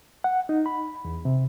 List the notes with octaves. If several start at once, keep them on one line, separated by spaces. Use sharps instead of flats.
F#5
D#4
B5
E2
C3